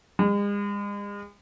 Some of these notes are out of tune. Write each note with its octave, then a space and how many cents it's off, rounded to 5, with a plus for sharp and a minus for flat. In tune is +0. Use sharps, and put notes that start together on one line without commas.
G#3 -40